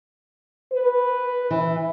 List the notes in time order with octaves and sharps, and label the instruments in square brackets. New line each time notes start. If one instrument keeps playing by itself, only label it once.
[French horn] B4
[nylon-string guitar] E3